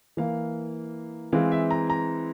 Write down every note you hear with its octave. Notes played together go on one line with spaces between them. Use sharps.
E3 A#3 F5
E3 G#3 C4 F5
E5
A#5
A#5